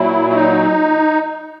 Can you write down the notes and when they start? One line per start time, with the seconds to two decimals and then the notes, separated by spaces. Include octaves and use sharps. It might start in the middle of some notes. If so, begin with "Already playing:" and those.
Already playing: A#2 F#3 E4
0.30 E4
0.34 D#4